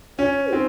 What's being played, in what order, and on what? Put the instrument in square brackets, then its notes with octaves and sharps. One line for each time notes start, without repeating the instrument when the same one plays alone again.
[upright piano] C#4 [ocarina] C#5
[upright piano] C4 [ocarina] D#4